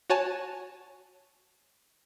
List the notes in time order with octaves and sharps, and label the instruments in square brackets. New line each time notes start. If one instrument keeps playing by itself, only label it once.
[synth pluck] F#4 C#5 G#5 A5